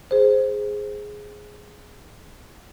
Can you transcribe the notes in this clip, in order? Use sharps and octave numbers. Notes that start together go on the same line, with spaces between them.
G#4 C5